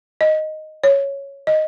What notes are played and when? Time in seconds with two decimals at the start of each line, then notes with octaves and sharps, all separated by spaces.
0.21 D#5
0.83 C#5
1.47 D#5